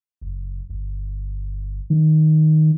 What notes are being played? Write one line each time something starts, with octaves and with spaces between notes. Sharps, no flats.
F#1
G1
D#3